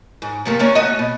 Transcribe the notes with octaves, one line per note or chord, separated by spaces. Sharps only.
G#2
C3 A3 A#3
A#3 C#4 D4
A3 F#4 D#5
B2